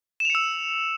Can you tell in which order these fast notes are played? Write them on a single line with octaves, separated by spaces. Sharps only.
E7 F7 C#7 E6